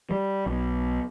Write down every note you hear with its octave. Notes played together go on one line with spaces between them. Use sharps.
G3
B1